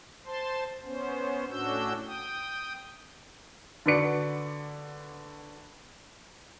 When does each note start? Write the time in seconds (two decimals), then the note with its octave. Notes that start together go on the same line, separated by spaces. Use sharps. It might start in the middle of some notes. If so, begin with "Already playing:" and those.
0.26 C5 A5 C6
0.85 B3 C#4 C5
1.50 A2 C#4 D4 F#4 E6 G6
2.06 G5 D#6
3.86 D3 F#4 B4 D5 C#7